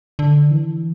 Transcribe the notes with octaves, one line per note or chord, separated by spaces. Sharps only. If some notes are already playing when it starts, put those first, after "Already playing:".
D3
E3